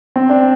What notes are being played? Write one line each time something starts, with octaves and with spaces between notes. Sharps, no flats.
C4
D4